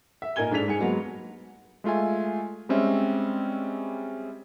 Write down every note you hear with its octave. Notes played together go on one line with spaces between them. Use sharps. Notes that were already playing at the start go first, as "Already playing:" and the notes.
E5
A#2 D#4 A#4 G#5 G#6 G7
G#2 D4 A4 B6 F7
G#2 G#5 C#7
F#3 G#3 A#3 B3
G#3 A3 F4 E5 G#5
G3 G#3 C4 C#4 E5